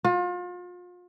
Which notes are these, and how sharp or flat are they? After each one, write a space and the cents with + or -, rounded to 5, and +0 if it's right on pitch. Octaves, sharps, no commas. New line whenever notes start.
F4 +35